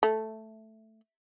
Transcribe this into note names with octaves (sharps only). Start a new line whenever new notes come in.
A3